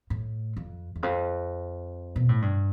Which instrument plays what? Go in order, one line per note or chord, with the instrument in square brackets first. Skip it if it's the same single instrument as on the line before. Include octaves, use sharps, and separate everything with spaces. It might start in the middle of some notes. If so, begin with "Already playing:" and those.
[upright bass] A2
F2
E2
F2
B2
A2
G2